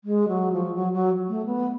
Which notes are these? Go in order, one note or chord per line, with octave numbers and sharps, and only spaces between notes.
G#3
F#3
F3
F#3
F#3
A3
B3